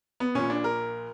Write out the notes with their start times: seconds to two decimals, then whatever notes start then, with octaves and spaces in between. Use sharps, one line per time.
0.20 B3
0.35 A#1 A#2 C#4
0.50 D4
0.64 A#4